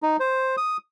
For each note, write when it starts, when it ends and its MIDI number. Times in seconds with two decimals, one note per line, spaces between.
0.03 0.17 63
0.20 0.56 72
0.57 0.77 87